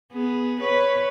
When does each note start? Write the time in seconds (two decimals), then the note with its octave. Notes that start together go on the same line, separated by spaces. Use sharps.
0.12 B3 G#4
0.61 B4 C#5